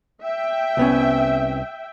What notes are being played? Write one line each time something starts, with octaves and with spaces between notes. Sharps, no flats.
E5 G5
C2 B3 C#4